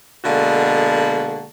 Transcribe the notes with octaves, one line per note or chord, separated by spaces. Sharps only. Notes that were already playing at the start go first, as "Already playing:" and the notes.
B2 D3 G#3 A#3 F#4 A4